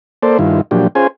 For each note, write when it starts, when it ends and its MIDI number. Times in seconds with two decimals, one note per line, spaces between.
0.23 0.38 58
0.23 0.38 69
0.23 0.38 72
0.23 0.38 74
0.39 0.61 43
0.39 0.61 51
0.39 0.61 64
0.39 0.61 65
0.71 0.87 46
0.71 0.87 53
0.71 0.87 54
0.71 0.87 62
0.71 0.87 67
0.95 1.07 61
0.95 1.07 65
0.95 1.07 68
0.95 1.07 72
0.95 1.07 80